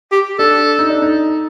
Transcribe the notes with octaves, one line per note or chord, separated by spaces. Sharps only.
G4
D4 A4
D#4
D4
D#4